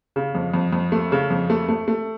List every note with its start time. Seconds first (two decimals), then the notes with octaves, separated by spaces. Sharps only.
0.16 C#3
0.35 F2
0.54 F2
0.73 F2
0.92 A3
1.12 C#3
1.30 F2
1.50 A3
1.68 A3
1.88 A3